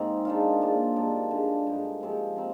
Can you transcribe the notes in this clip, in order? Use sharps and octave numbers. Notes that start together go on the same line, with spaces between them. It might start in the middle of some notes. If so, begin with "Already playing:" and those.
Already playing: G#2 D#3 G#3 A#3 C4 D#4
D#3 G#3 D4 F4
A#2 G#3 D4 F4
G#2 D#3 G3 D4
D3 G#3 D4
G2 D3 G#3 D#4
C3 F3 G#3 C4
C4 D#4